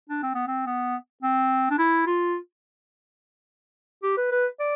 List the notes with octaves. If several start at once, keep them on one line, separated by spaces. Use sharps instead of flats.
D4
C4
B3
C4
B3
C4
D4
E4
F4
G4
B4
B4
D5